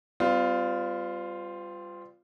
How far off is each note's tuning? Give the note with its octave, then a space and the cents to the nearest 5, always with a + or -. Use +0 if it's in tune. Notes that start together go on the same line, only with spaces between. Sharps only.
G3 +0 C4 -45 F4 +0